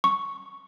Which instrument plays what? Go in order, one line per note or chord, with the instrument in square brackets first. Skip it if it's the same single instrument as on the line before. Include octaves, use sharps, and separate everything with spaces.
[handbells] C#6